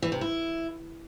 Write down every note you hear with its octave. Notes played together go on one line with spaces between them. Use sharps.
E3
C3
E4